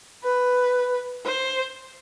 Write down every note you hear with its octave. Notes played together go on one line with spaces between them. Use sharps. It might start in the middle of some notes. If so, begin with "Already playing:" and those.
B4
C5